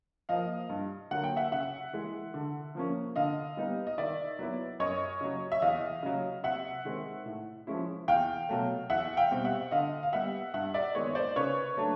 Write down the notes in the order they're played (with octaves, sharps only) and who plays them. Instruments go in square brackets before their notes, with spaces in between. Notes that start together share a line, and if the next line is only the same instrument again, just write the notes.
[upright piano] F3 A#3 D#5 F5
G2
D3 F#3 A#3 F#5
G5
E5 F#5
C#3 E5 F#5
E3 G#3
D3
F3 A#3 C#4
D3 D#5 F5
G3 B3 D#4
D#5
D#3 D5 E5
F#3 B3 E4
F#2 C#5 D#5
C#3 F#3
E5
E2 D#5 F5
C#3 F#3
C3 E5 F#5
D#3 G#3 C4
A2
F3 G#3 C#4 E4
E2 F5 G5
B2 F#3 A3
E2 E5 F#5
F5 G5
B2 G3 C4
E5 F#5
D3 D#5 F5
F5
G3 B3 E5 F#5
G2 E5 F#5
D5 E5
D#3 G#3 B3 C#5 D#5
C5 D5
C#3 B4 C#5
F#3 A3 D4